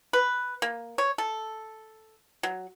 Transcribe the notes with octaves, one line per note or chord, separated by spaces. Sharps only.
B4
A#3
C#5
A4
F#3